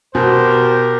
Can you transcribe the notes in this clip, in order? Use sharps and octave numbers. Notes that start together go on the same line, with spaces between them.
B2 F#4 G4 A#4 C5